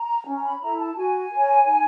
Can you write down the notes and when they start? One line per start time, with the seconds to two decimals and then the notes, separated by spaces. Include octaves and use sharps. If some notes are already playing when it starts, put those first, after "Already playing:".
Already playing: A#5
0.27 C#4
0.37 A#5
0.44 B5
0.61 E4 A4 A#5
0.78 A5
0.96 F#4 G#5
1.31 A#4 C#5
1.66 D#4